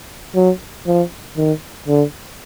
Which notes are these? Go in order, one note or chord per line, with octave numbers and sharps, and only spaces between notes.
F#3
F3
D#3
D3